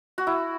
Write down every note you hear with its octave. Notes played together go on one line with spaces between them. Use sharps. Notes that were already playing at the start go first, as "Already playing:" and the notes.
F#4
E4